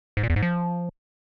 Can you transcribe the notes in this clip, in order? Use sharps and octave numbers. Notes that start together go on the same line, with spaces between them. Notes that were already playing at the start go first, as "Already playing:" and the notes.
G#2
A#2
E2
G#2
F3